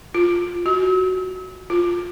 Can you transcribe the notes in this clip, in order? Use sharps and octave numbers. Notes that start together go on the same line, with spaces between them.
F4
F#4
F4